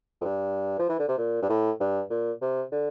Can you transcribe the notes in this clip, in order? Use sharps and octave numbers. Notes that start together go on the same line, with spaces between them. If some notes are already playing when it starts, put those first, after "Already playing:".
F2
G2
F3
E3
D3
C3
A#2
G2
A2
G2
A#2
C3
D3